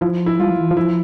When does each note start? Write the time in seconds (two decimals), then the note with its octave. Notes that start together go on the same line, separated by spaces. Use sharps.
0.01 F3 E4
0.26 E4
0.39 G3 F4
0.50 F3
0.61 E3
0.71 F3
0.77 E4